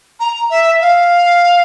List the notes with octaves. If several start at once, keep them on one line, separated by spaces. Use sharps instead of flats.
A#5
E5
F5